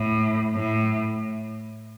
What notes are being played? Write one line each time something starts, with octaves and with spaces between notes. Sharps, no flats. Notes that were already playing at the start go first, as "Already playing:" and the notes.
Already playing: A2
A2